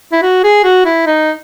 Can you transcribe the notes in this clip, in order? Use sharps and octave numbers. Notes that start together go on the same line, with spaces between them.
E4
F#4
G#4
F#4
E4
D#4